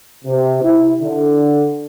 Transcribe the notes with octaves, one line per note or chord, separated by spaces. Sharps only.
C3
E4
D3